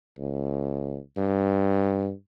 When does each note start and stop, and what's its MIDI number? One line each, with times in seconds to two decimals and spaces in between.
0.19 0.98 37
1.17 2.11 43